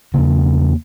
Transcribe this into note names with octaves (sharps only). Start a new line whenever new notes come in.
E2 C#3 A#3